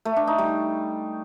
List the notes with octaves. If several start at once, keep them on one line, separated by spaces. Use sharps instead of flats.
A3
D4
D#4
G3